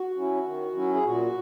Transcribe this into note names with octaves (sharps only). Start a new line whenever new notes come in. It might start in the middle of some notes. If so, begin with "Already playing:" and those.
Already playing: F#4
F#3 C#4 E4
D#3
F#3 C#4 E4
G#4
A#2 F#4